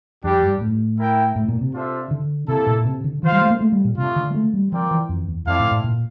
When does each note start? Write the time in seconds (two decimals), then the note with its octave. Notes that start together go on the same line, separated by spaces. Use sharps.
0.24 F2 G3 D4 G4
0.43 G2
0.61 A2
0.98 E4 A#4 E5 G5
1.36 A2
1.48 A#2
1.61 C3
1.74 D4 F4 A4 C5 E5
2.11 D3
2.48 C3 A#3 E4 A4
2.67 A#2
2.85 C3
3.04 D3
3.22 E3 F4 C5 F5
3.32 G3
3.42 A3
3.50 A#3
3.61 A3
3.72 G3
3.85 A#2
3.97 C3 A3 D4 F4
4.16 D3
4.30 G3
4.34 A3
4.54 G3
4.72 F3 C4 F4 A#4 D5 G5
4.91 E3
5.09 F2
5.28 E2
5.46 F2 C4 E4 A4 D5 F5
5.59 A2
5.71 A2
5.84 A#2